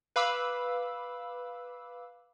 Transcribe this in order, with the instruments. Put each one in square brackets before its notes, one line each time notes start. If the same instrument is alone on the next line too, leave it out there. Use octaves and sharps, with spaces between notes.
[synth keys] B4 F5 B5 D6 E6